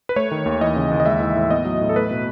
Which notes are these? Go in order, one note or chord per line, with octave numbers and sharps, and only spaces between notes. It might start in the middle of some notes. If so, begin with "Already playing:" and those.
B4
A3 C#5
D#3
D#2
E3 D#5
C#3
D#2
D#5
G#3 E5
E3
A2
B3 D#5
F#3
A2
A4
A3 B4
B2